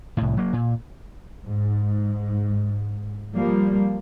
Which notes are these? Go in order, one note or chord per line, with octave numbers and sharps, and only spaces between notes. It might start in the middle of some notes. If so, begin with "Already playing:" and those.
C2 A2
F#3 A#3
A#2
G#2
F3 G3 A#3